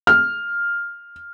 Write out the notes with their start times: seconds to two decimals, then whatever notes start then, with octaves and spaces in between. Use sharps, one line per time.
0.07 F6